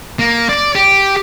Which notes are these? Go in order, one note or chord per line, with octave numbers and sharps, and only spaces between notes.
A#3
D5
G4